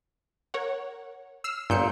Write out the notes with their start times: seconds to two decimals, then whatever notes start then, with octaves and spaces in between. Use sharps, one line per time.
0.54 A#4 C#5 F#5
1.44 E6 F6 C7
1.70 G1 G2 A#2 G6 C#7